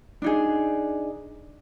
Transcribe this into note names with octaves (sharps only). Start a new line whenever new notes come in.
D4 D#4 G#4